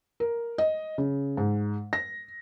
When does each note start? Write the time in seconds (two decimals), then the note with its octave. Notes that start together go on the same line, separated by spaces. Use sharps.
0.20 A#4
0.58 D#5
0.98 C#3
1.37 G#2
1.93 A#6